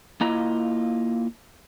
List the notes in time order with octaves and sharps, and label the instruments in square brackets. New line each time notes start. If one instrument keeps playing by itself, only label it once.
[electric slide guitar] A#3 E4 F4 D#5 A#5